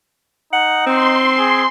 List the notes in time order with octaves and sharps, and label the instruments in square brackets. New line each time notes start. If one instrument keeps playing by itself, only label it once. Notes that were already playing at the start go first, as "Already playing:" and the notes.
[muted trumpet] D#4 [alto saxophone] F#5
[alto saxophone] C4 [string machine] C6
[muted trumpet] G#4